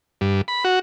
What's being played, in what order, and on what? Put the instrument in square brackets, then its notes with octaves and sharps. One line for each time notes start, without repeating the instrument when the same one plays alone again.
[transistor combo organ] G2
B5
F#4